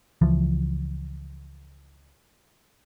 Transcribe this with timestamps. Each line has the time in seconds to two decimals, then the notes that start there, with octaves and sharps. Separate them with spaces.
0.21 C#2 E3 F3